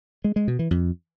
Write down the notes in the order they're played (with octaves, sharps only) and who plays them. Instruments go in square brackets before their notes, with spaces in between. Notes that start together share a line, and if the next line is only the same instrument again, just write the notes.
[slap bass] G#3
G#3
B2
E3
F2